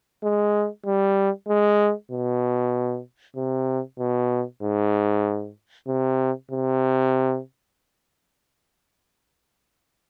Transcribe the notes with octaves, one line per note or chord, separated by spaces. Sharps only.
G#3
G3
G#3
B2
C3
B2
G#2
C3
C3